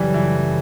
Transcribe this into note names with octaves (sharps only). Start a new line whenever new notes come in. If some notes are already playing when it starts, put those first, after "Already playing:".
Already playing: F#2 C#3 E3 F#3 G3 A3
E3